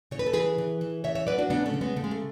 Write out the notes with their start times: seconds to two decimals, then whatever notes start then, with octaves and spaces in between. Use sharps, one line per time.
0.11 C#3 C#5
0.19 B4
0.26 A4
0.33 E3 G#4 B4
0.58 E3
0.81 E3
1.04 C#3 C#5 E5
1.15 C#5 E5
1.27 F#3 B4 D5
1.38 D4 F#4
1.50 C#3 B3 D4
1.66 A3 C#4
1.74 C#3
1.81 G#3 B3
1.96 C#3 A3
2.04 G#3
2.11 A3